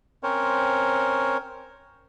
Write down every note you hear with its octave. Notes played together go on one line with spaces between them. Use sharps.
C4 C#4 A#4 C5 C#5